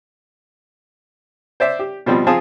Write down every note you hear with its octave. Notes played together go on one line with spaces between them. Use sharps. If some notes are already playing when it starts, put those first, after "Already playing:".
C5 D5 E5
G4
B2 F3 G3 C4
F3 C4 F4 G#4 A5